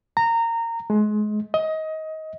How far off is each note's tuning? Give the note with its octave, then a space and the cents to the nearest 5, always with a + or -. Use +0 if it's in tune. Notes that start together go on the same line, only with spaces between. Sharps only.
A#5 -20
G#3 +30
D#5 +20